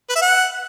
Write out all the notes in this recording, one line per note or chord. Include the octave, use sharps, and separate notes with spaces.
B4
E5
F#5